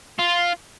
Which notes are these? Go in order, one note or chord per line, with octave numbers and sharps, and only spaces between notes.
F4